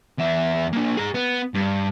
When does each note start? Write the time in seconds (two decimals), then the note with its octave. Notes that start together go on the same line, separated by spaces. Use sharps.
0.18 E2 E5
0.72 A#3 D4
0.97 G#4 A#5
1.14 B3
1.55 G2